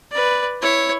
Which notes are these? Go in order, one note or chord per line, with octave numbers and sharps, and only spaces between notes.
B4 D5
E4 C#5